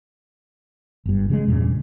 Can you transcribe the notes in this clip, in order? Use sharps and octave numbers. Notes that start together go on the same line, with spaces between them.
G1 G2
C#3 F3 G#3
E2 G2 A#2 C#3